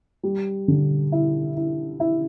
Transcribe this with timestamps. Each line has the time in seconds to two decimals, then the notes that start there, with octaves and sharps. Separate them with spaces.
0.23 G3
0.68 D3
1.12 E4
1.57 E4
2.00 E4